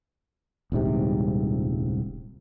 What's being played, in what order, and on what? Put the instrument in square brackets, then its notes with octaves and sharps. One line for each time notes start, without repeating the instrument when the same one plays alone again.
[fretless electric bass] D#1 C2 G#2 C3